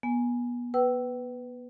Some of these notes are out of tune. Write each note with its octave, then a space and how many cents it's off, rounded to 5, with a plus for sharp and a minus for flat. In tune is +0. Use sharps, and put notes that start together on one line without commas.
B3 -30 G#5 +0
B4 +10 G5 -35 E6 +0